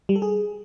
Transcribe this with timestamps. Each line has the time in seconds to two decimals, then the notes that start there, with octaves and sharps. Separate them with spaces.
0.09 G3
0.16 A4
0.22 G#4